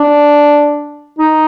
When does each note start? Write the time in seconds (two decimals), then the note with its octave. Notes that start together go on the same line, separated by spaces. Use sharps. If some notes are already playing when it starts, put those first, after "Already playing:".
Already playing: D4
1.19 D#4